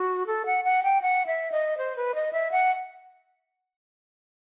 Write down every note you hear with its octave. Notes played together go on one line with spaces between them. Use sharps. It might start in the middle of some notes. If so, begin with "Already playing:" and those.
Already playing: F#4
A4
F#5
F#5
G5
F#5
E5
D#5
C5
B4
D#5
E5
F#5